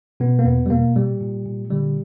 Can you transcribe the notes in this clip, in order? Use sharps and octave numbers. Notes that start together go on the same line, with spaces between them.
B2 B3
A#3
E2 B3
G3
B2 A#3
A#2 G3
A#2
A#2
D3 G3